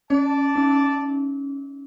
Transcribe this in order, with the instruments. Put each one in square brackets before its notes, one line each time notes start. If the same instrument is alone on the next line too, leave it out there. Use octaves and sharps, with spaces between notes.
[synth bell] C#4 [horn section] D5 A5
[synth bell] C#4 D#4